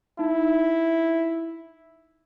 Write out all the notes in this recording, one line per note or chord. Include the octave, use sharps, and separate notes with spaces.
D#4 E4